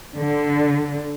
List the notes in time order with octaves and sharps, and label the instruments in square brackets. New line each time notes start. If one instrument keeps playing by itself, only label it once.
[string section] D3